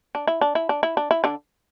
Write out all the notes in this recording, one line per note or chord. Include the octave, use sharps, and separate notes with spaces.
D4
E4
D4
E4
D4
E4
D4
E4
D3 D4